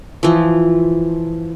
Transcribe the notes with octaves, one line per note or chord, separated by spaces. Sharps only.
E3 F3